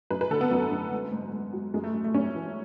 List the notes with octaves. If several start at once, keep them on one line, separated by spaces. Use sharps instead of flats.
F#2 B4
B4
D3 A4
B3
F#2 B3
F#2
G#2
G#2
G#2
F#3
F#2 G#3
A3
F#2
A3
F#2 C#4
E3